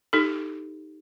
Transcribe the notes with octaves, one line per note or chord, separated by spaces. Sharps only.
D#4 G4 A4